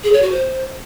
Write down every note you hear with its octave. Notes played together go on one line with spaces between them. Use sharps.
G#4
C#5
F#4
C5